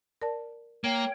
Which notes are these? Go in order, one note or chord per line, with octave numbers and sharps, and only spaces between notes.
A#4 D5 A5
A#3 C#5 G5